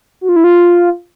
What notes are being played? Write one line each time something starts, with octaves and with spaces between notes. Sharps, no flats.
F#4
F4
E4
F4